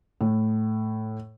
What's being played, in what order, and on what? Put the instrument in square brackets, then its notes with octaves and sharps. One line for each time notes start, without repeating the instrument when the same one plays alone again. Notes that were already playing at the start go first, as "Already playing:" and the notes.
[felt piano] A2